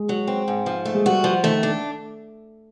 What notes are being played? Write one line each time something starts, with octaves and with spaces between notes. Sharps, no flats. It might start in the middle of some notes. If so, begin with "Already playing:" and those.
Already playing: G#3
F#3
C4
G#2
F3
A3
G#3
G3 F#4
F3
D#3 A3
D4